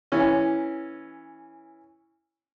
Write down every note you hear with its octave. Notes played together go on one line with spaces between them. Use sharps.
E3 C#4